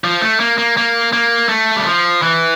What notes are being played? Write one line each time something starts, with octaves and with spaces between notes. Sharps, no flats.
F3
A3
A#3
A#3
A#3
A#3
A3
G3
F3
E3